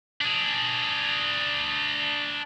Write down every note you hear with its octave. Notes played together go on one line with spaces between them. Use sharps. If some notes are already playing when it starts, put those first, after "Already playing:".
D4 G#4